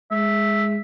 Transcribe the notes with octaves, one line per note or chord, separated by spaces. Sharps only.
G#3 E5